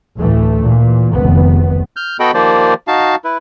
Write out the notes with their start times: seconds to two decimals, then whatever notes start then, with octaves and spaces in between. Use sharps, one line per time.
0.16 D2 A2 E3 A3
0.61 A#2 E3
1.13 F1 C#2 D#3 B3
1.96 F6 G6
2.20 B3 F#4 A4 D#5 G5 B5
2.34 D#3 F3 A#3 G4 C5 D5
2.88 D#4 F#4 F5 A5
3.24 E4 B4